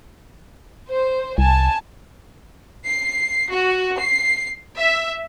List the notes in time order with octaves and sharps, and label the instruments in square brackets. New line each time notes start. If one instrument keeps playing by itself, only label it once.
[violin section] C5
[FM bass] C2 [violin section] G#5 A5
[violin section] C7
F#4
C7
E5